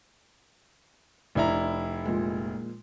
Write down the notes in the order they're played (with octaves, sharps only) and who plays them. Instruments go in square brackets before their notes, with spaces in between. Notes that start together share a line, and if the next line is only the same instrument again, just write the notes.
[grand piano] F1 E4 A#5 [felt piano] D4
[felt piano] A#2 F3 G#3